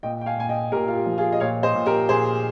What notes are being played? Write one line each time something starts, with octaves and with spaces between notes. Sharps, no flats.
A#2 D#5 G5
G5
F5 G#5
A#2 G#5
D#5 G5
A#2 G4 A#4
F4
G4
F3
F4 G#4
D#5
A#2 C#5 F5
C5 D#5
A#2
G4 A#4
A#2 G#4 C5